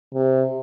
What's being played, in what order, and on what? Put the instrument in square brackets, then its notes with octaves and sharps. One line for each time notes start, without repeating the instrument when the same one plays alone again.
[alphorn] C3